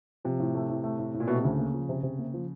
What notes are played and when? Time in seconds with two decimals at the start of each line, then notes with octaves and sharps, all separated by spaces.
0.24 C3 F3
0.40 A2
0.55 A3
0.69 A2
0.84 A3
0.99 A2
1.14 A2
1.20 A#2
1.28 B2 A3
1.35 C3
1.44 D2 C#3
1.59 A#3
1.74 F3
1.89 C3
2.03 C3
2.19 A#3
2.34 F3